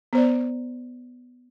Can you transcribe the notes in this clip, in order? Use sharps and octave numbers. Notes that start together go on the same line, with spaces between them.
B3 C5 D5